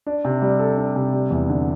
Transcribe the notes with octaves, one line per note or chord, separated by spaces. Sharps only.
D4
C3
G3
A4
D4
C3
G3
E2
D3